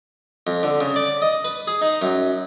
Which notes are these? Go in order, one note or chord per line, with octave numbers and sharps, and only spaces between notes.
F2
D3
C#3
D5
D#5
B4
G#4
D#4
F#2